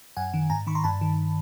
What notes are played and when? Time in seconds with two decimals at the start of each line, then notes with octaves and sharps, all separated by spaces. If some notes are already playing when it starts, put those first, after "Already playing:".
0.17 F#2 F#5 G#5
0.34 D#3
0.50 G#2 G#5 A#5
0.67 D#3 B5 C#6
0.75 A#5 C6
0.84 G2 A5 B5
1.01 D#3